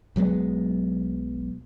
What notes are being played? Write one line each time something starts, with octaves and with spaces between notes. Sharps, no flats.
B1 F#3 G#3 B3